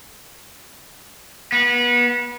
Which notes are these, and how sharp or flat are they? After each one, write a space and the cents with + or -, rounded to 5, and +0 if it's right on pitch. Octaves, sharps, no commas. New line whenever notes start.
B3 -30